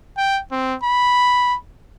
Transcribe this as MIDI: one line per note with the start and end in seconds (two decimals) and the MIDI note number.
0.17 0.40 79
0.52 0.75 60
0.83 1.56 83